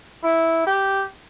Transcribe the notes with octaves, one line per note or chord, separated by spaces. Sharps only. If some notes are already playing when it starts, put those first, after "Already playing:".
E4
G4